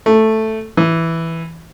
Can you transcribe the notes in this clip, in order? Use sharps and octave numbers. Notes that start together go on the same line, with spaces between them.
A3
E3